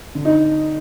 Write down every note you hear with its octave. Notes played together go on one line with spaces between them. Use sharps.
D3
D#4